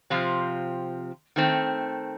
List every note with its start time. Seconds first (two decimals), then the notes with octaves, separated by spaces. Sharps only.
0.10 C3 F3 C4 F4
1.36 D#3 A3 C4